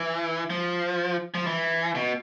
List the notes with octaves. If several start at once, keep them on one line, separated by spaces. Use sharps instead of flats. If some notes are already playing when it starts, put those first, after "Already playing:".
Already playing: E3
F3
F3
E3
B2